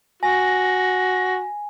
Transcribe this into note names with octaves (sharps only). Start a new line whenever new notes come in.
F#4 G#5 A#6